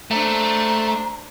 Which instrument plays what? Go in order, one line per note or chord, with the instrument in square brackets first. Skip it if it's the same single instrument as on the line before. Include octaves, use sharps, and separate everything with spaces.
[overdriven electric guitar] A3 [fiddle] D4 C5 [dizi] A#5